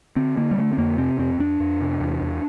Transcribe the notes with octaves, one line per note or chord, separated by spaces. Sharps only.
D3 C4
D3 A#3
G3
D3 A3
C4
F2 A#3
C3 C4
F2 C4
F2 D4
F2
C3
E2
E2